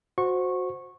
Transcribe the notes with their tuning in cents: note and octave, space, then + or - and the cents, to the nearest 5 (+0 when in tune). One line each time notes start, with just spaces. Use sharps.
F#4 -15 C5 +0 C#6 -15